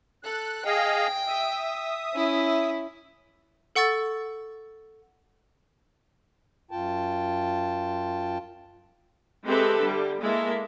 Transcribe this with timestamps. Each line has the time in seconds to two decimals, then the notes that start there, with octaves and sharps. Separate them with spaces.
0.23 A4 F#6
0.65 G#4 D#5 F5 G5
1.27 E5 D#6
2.14 C#4 E4
3.76 A4 F#5 C#6 E6 A6
6.71 F#2 F4 G5 A5
9.45 G#3 C4 G4 A4 B4 E5
9.79 D3 G3
10.22 G#3 A#3 E4 A4 E5